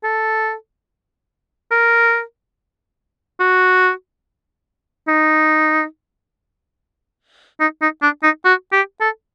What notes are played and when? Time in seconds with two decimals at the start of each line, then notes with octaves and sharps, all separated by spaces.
0.03 A4
1.71 A#4
3.40 F#4
5.08 D#4
7.60 D#4
7.82 D#4
8.02 D4
8.23 D#4
8.45 F#4
8.73 G4
9.01 A4